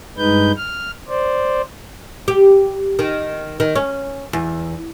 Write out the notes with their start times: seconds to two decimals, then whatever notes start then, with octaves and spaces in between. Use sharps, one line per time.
0.18 G2 G#3 D#4 B4 G6
0.57 F6
1.09 C5 D5
2.28 G4
2.99 D#3
3.60 D#3
3.76 C#4
4.33 E2